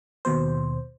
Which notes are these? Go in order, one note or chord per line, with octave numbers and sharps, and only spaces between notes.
D#2 B2 C5